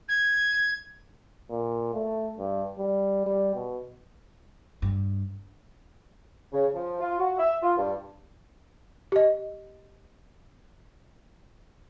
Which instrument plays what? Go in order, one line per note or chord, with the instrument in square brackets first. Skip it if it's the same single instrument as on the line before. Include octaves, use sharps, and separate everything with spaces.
[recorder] G#6
[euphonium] A#2
A3
G2
G3
G3
B2
[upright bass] G2
[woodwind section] C#3
F3
F4
F#4
E5
F4
G2
[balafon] G4 D#5